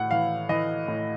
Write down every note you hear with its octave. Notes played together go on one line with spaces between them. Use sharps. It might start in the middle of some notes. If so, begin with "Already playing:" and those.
Already playing: A2 F#5
E3 F5
E3 D#5
A2